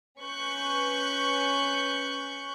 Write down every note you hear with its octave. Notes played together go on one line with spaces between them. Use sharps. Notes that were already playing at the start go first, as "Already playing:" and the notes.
C#4 B4 C#6 F#6 G6